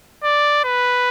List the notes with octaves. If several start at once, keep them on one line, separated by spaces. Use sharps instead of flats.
D5
B4